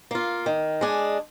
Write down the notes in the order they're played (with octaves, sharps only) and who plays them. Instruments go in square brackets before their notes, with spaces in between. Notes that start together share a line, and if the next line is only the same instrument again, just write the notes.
[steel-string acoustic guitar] A#3 F4
D#3
G#3 D4 G#4